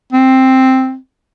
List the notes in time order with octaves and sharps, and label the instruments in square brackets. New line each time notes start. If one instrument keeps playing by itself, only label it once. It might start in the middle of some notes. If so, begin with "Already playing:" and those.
[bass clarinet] C4